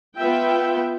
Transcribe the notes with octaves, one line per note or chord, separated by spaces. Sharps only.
B3 F4 E5 G5